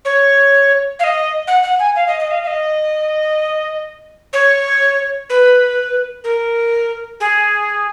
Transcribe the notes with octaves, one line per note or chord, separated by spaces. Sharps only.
C#5
F5
D#5
F#5
F#5
G#5
F5
D#5
D#5
F5
F5
D#5
C#5
B4
A#4
G#4